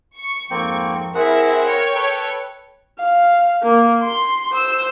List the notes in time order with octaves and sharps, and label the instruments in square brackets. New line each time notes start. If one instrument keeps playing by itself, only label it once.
[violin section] C#6
[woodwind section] F2 G#2 F3 [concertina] A#3 C4 G5
[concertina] C4 G#4 F#5 [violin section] E4 E5 [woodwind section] A#4
[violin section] C#5 G5
[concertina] A4 B4
[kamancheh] F5
A#3
C6
C5 E6